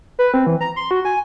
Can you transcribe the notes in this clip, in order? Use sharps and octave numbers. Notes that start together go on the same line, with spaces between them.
B4
C4
E3
A#5
C6
F#4
G#5